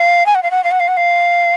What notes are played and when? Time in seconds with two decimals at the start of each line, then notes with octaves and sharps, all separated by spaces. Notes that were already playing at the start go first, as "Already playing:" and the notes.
Already playing: F5
0.26 G#5
0.35 F#5
0.43 F5
0.51 F#5
0.64 F5
0.71 F#5
0.80 F5
0.88 F#5
0.97 F5